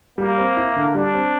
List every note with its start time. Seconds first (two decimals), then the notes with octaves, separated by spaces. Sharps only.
0.18 G3 A#3
0.38 C4
0.57 E4
0.76 D3
0.95 G3 D4
1.14 C4